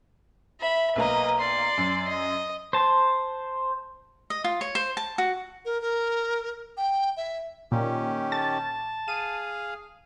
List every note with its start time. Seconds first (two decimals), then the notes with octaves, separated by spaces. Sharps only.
0.60 E5 B5
0.96 B1 A#3 B4 D#5 A#5
1.39 D5 C6
1.78 F#2
2.08 D#5
2.73 C5 A5
4.30 D#5
4.44 F4
4.61 C#5
4.75 C5
4.97 A5
5.18 F#4
5.65 A#4
5.82 A#4
6.77 G5
7.17 E5
7.72 A#2 D#3 C#4 G4
8.32 A5 A6
9.08 G#4 F5 D#7